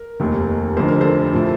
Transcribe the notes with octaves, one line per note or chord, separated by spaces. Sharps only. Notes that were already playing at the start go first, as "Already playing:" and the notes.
Already playing: A#4
F1 D#2 D#3
F1 F2 D3 C5
A#4
A4 C5
A2 F3